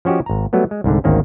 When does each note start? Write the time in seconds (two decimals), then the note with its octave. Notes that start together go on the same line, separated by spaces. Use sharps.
0.05 F3 C#4 F#4 G4 D#5
0.26 G#1 A#5
0.53 F#3 G3 A3 B3
0.71 G#3
0.84 C2 G#2 D3
1.04 G#1 D2 D#3 A#3 C4 C#4